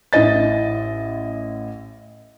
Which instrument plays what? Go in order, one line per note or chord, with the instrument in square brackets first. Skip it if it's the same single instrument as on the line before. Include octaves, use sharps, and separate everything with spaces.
[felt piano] A1 E4 D#5 A6